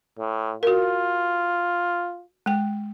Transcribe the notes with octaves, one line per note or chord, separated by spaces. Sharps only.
A2
F4 F#4 A#4
G#3 G5